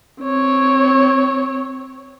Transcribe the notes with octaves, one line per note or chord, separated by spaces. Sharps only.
C4 C#5